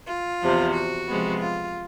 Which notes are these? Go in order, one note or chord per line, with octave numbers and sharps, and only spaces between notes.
F4
E2 C3 F3
F#4
C3 F3 G#3 B3
F4